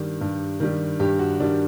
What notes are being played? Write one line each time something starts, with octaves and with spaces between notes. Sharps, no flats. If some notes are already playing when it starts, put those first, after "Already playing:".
Already playing: G2 D#3 G3
G2
D#3 G3
G2 G4
F#4
D#3 G3 D4